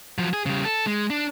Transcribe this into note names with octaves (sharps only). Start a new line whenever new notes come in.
F3 F#3
G#4
C#3 G3
A4
G#3
D4